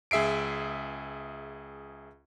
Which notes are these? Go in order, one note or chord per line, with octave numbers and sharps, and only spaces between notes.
C#2 G#4 E5 C7 D7